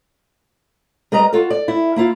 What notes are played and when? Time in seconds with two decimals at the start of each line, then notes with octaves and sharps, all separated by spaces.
1.12 G3 B4 D#5 A#5
1.33 F4 F#4 A4
1.50 D5
1.68 E4
1.96 A#3 E4 F4